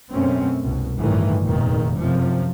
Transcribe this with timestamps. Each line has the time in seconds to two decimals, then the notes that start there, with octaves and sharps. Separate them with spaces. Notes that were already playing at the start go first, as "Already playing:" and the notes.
0.12 F#2 B2 A3 C4 C#4
0.61 C2 B2
0.97 G1 A2 D#3 E3
1.44 F1 E2 A#2 D#3
1.96 F#2 C3 F3